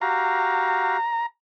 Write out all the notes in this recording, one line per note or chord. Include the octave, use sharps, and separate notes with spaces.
F#4 G4 F5 A#5